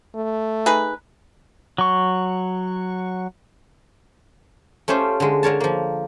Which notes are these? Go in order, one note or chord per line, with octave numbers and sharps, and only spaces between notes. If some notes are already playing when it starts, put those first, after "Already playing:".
A3
D#4 G#4 B4
F#3 C#6
A3 C#4 F4 G4 C5
D3 G#3
D3 A#4 C#5 A5
F3 A#3